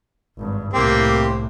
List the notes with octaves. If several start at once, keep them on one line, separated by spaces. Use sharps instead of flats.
G#1 G2
C2 A2 A#3 C4 G4